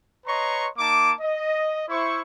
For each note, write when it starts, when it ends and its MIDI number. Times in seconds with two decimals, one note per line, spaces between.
0.26 0.66 71
0.26 0.66 73
0.26 0.66 75
0.26 0.66 82
0.26 0.66 84
0.26 0.66 85
0.78 1.12 58
0.78 1.12 63
0.78 1.12 81
0.78 1.12 86
1.21 1.83 75
1.89 2.20 64
1.89 2.20 72
1.89 2.20 85